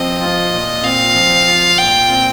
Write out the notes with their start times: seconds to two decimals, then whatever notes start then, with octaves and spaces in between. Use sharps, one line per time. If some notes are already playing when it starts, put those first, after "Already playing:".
Already playing: F3 C4 D#5
0.21 F4
0.52 A#2
0.84 C4 F5
1.15 F3
1.46 F4
1.77 A#2 G5
2.09 C4